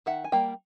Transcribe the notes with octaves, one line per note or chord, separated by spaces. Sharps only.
D#3 E5 F#5
G#5
G3 A#3 G5